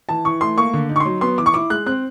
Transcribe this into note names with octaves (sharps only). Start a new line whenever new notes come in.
E3 A5
E3 C#6
A3 C6
A#3 C#6
D3
D#4
C#6
C6
F#3
B3 C6
E3 D6
C#6
E4 D6
G#3 F#6
C4 F#6